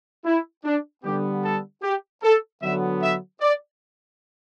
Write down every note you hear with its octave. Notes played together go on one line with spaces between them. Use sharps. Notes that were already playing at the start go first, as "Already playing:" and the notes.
E4
D4
D3 G3 B3 G4
A4
G4
A4
D3 F#3 B3 E5
E5
D5